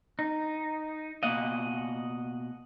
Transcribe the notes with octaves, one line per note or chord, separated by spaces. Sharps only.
D#4
B2 A#3 D#5 F5 F#5